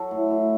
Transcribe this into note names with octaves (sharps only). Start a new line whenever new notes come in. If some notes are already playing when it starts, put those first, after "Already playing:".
Already playing: F#3 A4
A2
A2